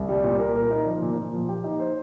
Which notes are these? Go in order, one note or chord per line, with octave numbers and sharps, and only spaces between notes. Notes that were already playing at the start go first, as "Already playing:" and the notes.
Already playing: C2
G3
A#2
A#4
A#4
D#4
F3
A#2
A#2
F3
G4
D#4
C5